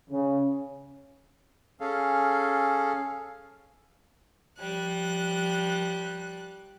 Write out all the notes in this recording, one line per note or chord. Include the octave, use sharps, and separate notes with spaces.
C#3
C#4 G#4 A4 F5
F3 G3 F#6